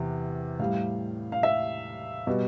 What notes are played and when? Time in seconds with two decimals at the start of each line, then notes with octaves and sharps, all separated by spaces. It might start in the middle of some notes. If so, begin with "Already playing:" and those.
Already playing: E2 C3
0.59 A2 G3 F5
1.32 F5
1.43 E5
2.27 B2 G3